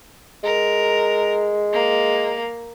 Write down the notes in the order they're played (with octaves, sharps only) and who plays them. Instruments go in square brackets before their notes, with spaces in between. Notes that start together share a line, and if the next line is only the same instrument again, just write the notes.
[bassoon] G#3 [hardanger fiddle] A#4
[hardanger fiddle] A#3